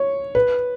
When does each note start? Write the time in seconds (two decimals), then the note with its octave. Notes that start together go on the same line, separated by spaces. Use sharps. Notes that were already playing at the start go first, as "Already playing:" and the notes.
Already playing: C#5
0.35 B4